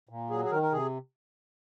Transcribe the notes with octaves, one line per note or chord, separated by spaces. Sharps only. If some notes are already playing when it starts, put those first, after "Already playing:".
A#2
F#3 G#4
G#4
D#3 A#4
A#4
C3 G#4